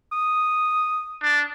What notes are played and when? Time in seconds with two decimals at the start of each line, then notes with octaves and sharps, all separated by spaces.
0.12 D#6
1.23 D4